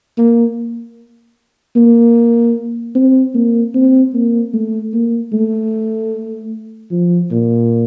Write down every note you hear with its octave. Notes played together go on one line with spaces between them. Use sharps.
A#3
A#3
C4
A#3
C4
A#3
A3
A#3
A3
F3
A#2